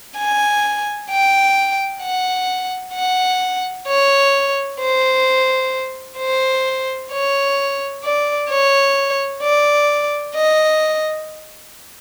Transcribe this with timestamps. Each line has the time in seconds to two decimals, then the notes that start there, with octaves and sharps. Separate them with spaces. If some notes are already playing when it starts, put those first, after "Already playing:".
0.17 G#5
1.10 G5
2.02 F#5
2.94 F#5
3.87 C#5
4.80 C5
6.18 C5
7.12 C#5
8.04 D5
8.49 C#5
9.43 D5
10.35 D#5